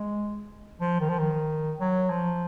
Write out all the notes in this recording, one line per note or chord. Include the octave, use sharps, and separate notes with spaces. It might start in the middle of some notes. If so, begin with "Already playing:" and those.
Already playing: G#3
F3
D#3
F3
D#3
F#3
F3